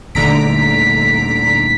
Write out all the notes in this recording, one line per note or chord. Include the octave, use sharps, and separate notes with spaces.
D#1 D#2 D3 A3 A#5 B6 D7